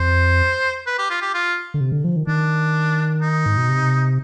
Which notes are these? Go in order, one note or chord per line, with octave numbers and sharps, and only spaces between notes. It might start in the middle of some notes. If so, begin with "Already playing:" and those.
Already playing: F2 C5
B4
G4
F4
G4
F4
D3
C3
D3
F3
D#3
D#3 D4
D#4
G#2
B2
C3